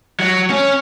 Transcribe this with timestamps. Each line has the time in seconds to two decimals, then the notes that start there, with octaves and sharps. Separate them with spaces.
0.20 F#3
0.50 C#4